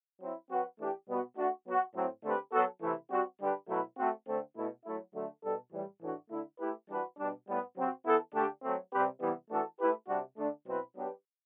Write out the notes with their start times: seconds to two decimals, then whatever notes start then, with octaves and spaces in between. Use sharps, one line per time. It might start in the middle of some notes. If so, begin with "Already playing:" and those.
0.20 F#3 C4 E4
0.49 F#3 C4 F#4 B4
0.79 E3 A3 D4 G4
1.07 B2 G3 B3 F#4
1.36 A3 D4 F#4
1.66 F#3 B3 F#4
1.94 A2 F#3 C4
2.23 D3 A3 C4 G4 B4
2.52 F#3 B3 F#4 A4
2.82 C3 E3 A3 E4
3.11 G3 C4 F#4
3.40 D3 G3 D4 G4 B4
3.69 B2 F#3 A3 E4 B4
3.98 A3 C4 F#4
4.27 D3 A3 C4
4.56 B2 A3 E4
4.85 F#3 A3 E4
5.15 D3 F#3 A3
5.44 B2 G3 D4 A4
5.72 A2 E3 G3
6.02 A2 E3 A3 D4 F#4
6.30 D3 A3 E4
6.59 A3 E4 G4 B4
6.89 E3 G3 D4 F#4 B4
7.18 B2 G3 D4
7.47 A2 G3 B3
7.76 C3 F#3 C4 F#4
8.05 E3 B3 E4 A4
8.34 D3 A3 D4 G4
8.62 F#3 A3 C4
8.92 C3 G3 C4 G4 B4
9.21 C3 E3 G3 B3
9.50 E3 A3 D4 F#4 A4
9.79 A3 E4 G4 B4
10.08 C3 G3 D4 F#4
10.38 D3 A3 D4
10.66 B2 F#3 C4 E4 B4
10.96 F#3 B3 D4 G4 B4